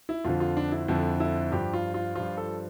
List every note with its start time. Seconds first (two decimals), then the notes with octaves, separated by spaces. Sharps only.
0.09 E4
0.25 F2 D3 F3 F4
0.40 F4
0.57 D4
0.72 E4
0.88 F2 D3 F3 E4
1.20 E4
1.52 G2 F3 G4
1.74 F4
1.94 F4
2.16 G2 F3 F4
2.37 A4